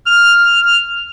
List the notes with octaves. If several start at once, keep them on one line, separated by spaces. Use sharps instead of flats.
F6